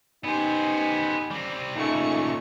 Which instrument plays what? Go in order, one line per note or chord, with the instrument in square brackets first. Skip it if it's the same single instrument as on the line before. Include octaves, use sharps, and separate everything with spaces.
[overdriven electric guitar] B3 C5 [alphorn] D#4 [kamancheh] G4 G#5
[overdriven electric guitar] G3 C4
[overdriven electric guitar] A#2 C#3 [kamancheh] A3 C#6 [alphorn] D#4